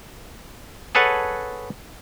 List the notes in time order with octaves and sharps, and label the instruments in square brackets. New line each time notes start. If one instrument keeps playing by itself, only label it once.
[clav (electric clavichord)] G#4 A4 B4 C#5 F#5 A5